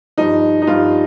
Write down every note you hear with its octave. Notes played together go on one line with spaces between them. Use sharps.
G2 F3 D#4
D#4
G2 F3 F4